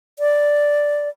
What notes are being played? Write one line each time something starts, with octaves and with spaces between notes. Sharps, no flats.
D5